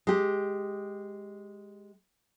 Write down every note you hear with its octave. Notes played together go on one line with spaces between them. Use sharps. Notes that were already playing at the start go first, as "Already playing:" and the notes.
G#3 G4